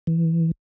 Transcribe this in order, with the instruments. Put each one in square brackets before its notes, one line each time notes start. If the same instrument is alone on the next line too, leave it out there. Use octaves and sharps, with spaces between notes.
[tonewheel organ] E3